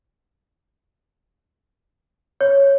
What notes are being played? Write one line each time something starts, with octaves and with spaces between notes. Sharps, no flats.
C#5